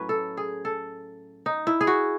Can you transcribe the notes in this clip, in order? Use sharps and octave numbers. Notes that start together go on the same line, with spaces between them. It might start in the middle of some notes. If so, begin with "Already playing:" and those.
Already playing: A2 F#3 C#4 B4
A4
G#4
A4
D#4
E4
G#4
F#4